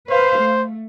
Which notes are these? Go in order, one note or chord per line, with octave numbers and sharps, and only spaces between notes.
B4 C5 F5
A3